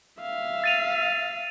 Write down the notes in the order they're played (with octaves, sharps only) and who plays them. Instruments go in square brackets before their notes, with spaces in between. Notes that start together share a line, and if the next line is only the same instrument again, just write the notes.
[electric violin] E5 F5
[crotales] A6 D#7 F7